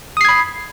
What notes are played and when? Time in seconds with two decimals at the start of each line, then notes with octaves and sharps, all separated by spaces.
0.17 D#6
0.21 C7
0.25 G#6
0.29 B5